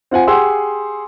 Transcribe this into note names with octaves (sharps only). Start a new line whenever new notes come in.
C4 F4 F#5 G#5
G4 G#4 F#5 G#5 C6 E6